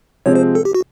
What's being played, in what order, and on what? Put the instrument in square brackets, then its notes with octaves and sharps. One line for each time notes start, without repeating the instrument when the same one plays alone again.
[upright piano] C3 F3 G#3 C4 [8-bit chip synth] C#5
[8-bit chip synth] C5
A4
G4
F#4